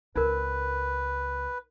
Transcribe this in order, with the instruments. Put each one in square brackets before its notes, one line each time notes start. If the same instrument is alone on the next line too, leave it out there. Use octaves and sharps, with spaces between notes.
[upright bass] C#2 C4 [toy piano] D#4 A#4 [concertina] B4